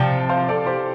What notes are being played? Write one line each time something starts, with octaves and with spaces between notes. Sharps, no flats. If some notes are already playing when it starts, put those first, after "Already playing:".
Already playing: C3 F3 D5 F5 G5 A5
C5 F5
A4 D5
G4 C5